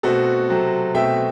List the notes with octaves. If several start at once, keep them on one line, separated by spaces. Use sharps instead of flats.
B2 A3 C4 F#4 A4
C3 F#3 C4
B2 A3 C4 E5 G5